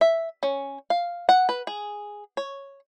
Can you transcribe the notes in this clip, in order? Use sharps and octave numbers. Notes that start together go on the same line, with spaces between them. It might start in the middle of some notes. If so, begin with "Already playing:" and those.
E5
C#4
F5
F#5
B4
G#4
C#5